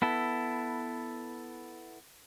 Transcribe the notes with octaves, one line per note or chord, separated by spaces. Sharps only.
B3 E4 A4